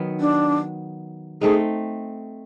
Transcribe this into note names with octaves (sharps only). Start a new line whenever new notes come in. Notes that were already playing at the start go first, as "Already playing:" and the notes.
Already playing: D#3 F#3 B3
D4
A3 C4 D#4 G#4